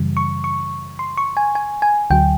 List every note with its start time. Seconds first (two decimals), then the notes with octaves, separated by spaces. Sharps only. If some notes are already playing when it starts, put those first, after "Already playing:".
Already playing: F#2 C#3 E3 G3
0.17 C#6
0.44 C#6
0.99 C6
1.18 C#6
1.37 G#5
1.55 G#5
1.82 G#5
2.10 D2 D3 F#3 G5